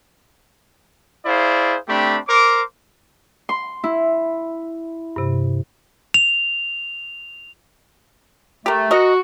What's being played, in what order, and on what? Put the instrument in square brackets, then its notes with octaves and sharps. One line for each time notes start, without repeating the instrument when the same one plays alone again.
[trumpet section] E4 G#4 C5 D5 F5
A3 C4 D4 G4 B5
A#4 C5 D6
[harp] C6
[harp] E4 [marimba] E6
[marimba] G2 C3
[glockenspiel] F7
[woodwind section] A3 [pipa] G4 A#4
[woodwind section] F#4 [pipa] A#4 D#5